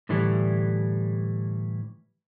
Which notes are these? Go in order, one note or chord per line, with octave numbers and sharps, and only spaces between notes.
A2 D3 E3 G3